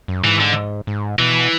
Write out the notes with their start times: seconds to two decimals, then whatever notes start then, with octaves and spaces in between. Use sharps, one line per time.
0.08 F#2
0.24 G#2 E3
0.40 D3
0.87 G#2
1.19 B2 E3